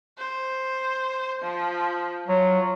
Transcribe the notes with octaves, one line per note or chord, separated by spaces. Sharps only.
C5
F3
F#3 F4